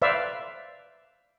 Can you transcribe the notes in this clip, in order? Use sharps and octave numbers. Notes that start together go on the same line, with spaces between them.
B4 C5 D5 E5 F5